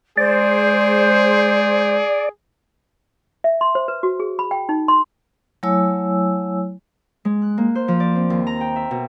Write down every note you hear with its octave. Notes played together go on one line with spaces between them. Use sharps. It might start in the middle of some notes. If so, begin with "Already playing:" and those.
G#3 G#4 C5 D5
E5
C6
C5
B4
F#4
G#4
B5
G5
D#4
C6
F#3 A3 E4 C#5 G#5 E6
G#3
F#6
A#3
C5
F3
D5
C4
D#2
A#5
G5
E5
B2